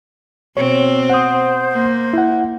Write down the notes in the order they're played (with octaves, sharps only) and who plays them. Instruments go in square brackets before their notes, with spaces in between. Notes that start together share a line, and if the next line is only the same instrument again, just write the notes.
[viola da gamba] B2 C4 [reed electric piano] C#5
[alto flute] C5 [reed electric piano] F#5 D#6
[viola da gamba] A#3
[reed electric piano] E4 F#5